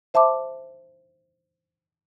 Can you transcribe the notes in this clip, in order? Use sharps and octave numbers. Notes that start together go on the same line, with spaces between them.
C5 E5 A5 C6 D6